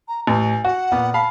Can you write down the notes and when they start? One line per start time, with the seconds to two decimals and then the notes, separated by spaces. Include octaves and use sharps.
0.08 A#5
0.27 A1 G#5
0.65 F#4 F#5
0.92 A#2 B3
1.14 F5 A5 B5